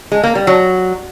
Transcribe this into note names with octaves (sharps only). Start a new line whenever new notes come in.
G#3
A#3
G3
F#3